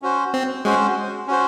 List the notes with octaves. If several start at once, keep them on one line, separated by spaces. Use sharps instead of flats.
C#4 F#4 C5
C4
G#3 C#4 F#4 C5
C#4 F#4 C5